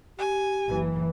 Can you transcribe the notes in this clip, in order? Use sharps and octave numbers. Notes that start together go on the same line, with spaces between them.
G4 G#5
F#1 E3